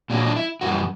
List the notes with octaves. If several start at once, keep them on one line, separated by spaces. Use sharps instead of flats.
A#2 F#3 D4
D4
E4
F#2 E3 G3 F#4